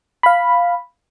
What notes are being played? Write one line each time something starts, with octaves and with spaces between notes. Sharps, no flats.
F5 B5